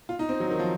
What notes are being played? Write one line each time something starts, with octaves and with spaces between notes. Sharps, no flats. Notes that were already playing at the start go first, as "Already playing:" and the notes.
F4
D#4
C4
F#3
D#3
F3